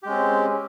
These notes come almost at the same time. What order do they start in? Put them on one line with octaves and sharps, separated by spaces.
G4 G#3 C#4 C4